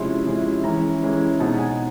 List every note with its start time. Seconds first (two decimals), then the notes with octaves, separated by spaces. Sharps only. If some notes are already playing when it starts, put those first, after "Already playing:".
Already playing: C3 F3 G#3 C#4 E4 C6
0.26 C3 F3 G#3 C#4 E4
0.64 E3 G#3 C#4 E4 A#5
1.02 E3 G#3 C#4 E4
1.40 B2 G#3 C4 D#4 A5
1.59 G#5